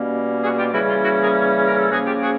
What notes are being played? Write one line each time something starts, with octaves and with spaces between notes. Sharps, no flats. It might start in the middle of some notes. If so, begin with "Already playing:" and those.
Already playing: B2 G3 A#3 C#4
F#4 G#4
F4 G4
C#3 E3 G3 A#3 C#4 E4 F#4
F4
E4 F#4
G#4 A#4
A#4
A4
C#3 F3 A#3 C#4 F#4 G#4
F4 G4
F#4 G#4